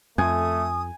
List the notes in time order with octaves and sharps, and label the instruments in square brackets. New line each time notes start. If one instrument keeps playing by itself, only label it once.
[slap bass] F2 [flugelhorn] A3 [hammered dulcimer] G#5 [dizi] D#6